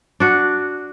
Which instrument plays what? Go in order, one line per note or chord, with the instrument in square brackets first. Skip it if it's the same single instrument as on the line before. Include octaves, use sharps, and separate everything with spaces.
[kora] D4 F#4